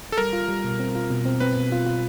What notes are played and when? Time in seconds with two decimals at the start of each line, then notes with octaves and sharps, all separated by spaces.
0.12 A4
0.18 G3 A#4
0.33 F4
0.49 G3
0.64 B2
0.79 C4
0.95 F4
1.10 B2
1.25 C4
1.40 C4 B4
1.57 B2
1.72 F4
1.86 F4